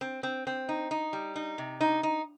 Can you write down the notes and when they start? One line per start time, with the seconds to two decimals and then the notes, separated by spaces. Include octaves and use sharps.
0.01 C4
0.23 C4
0.47 C4
0.69 D#4
0.91 D#4
1.13 G3
1.36 D#4
1.58 C3
1.81 D#4
2.03 D#4